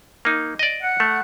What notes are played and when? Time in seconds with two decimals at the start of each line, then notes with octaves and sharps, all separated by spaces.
0.25 A#3 D#4
0.59 D5 D#5
0.81 F#5
1.00 A3